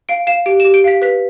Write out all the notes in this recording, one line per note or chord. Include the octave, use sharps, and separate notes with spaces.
F5 D7
F5 E7
G4 D7
E7
G4
D7
F5 B6
B4 B6